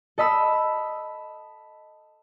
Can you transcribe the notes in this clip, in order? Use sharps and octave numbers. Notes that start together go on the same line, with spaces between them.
A4 D#5 B5 E6